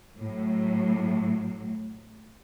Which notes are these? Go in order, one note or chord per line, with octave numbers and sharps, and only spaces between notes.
A2 F#3